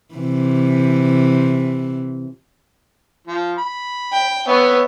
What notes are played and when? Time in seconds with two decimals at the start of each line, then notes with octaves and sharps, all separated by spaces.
0.14 C3 E3
3.27 F3
3.59 B5
4.12 G5
4.48 B3 B4 C#5 E5